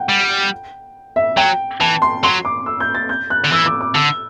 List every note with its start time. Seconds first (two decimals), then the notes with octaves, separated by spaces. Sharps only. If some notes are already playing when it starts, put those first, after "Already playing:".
Already playing: F#5 G5
0.09 G3
1.16 E5
1.37 F#3 G5
1.80 E3 A5
2.02 C6
2.23 F#3 C6
2.45 D6
2.66 E6
2.80 G6
2.95 A6
3.09 G6
3.30 F#6
3.44 D3
3.52 E3 E6
3.66 D6
3.81 D6
3.95 D3 E6